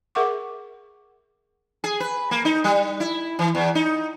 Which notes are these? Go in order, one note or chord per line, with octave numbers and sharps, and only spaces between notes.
G#4 A#4 E5 F#5 C#6 D6
G#4
B4
A#3
D#4
G3
E4
E3
E2
D#4